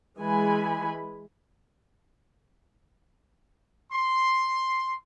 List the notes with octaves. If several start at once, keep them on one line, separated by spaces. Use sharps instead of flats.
E3 G#3 G#5 B5
C6